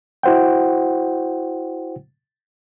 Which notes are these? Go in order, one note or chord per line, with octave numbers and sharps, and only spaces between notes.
E4 F#4 C5 F#5 G5